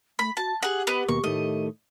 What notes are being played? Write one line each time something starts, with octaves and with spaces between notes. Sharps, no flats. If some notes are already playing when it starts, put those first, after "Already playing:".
A3 B5
F#4 A5
G4 G#4 F#5
B3 B4 D#5
D#2 B2 A#3 C#6
A2 D#3 A3 D#5